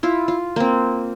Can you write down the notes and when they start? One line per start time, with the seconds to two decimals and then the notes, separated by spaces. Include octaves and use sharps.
0.03 E4 F4
0.28 F4
0.56 A#3 C4